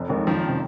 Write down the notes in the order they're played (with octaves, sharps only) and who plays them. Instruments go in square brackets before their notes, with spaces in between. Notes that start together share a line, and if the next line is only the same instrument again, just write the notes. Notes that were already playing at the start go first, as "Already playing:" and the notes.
Already playing: [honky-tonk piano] F1
D#2 D#3 G#3
[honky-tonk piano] F#1 [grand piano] D#3 F3
[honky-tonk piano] C3